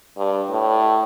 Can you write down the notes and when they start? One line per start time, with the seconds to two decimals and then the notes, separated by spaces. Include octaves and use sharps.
0.17 G2
0.49 A2